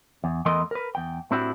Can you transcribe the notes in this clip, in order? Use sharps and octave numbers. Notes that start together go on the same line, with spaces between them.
E2
E2 E3 A3 A#4 D#5 C6
A#4 B4
E2 G5
A2 C4 D4 E4 F#4 G4